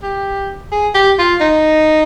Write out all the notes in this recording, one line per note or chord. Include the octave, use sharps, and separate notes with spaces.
G4
G#4
G4
F4
D#4